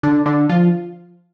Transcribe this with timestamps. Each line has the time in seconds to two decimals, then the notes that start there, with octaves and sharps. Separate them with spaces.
0.03 D3 D4
0.26 D3 D4
0.49 F3 F4